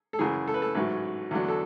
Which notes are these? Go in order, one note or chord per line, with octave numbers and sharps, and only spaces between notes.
A4
F#2 C#3 E3 G#4
A4
B4
A4
A1 G#2 F#3 B4
E2 D3 F#3
A4